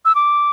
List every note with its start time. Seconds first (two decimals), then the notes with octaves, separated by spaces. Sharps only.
0.05 E6
0.15 D6